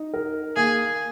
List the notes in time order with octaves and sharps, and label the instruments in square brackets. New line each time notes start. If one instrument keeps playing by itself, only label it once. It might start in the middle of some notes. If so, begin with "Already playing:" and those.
Already playing: [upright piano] D#4
A#4
[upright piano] A#3 [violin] G#4